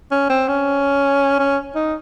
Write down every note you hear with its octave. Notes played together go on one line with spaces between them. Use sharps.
C#4
C4
C#4
C#4
D#4